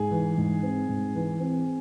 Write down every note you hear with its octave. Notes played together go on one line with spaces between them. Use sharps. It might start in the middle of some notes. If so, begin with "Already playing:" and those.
Already playing: G#2 G#4
E3
G#2
C4
G#2
E3
C4